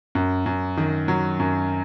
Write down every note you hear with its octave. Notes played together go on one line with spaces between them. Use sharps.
F#2
F#2
D#3
F#3
F#2